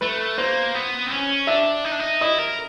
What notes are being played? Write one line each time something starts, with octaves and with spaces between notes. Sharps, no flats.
A3 B4
A#3 C5
B3
C4
C#4
D4 E5
D#4
D4
D#4
E4 D#5
A#4